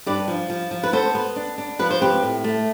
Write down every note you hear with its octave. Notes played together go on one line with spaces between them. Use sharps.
G2 B4 D5
F3
F3
F3
B4
B3 A4 C5
B3
D4
D4
F3 B4
C5
C4 G4 B4
A2
A3